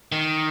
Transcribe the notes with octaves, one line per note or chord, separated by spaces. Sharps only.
D#3